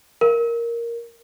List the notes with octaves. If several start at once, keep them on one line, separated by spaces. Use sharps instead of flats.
A#4